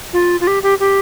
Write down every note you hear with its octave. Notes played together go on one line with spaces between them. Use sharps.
F4
F4
G4
G4
G4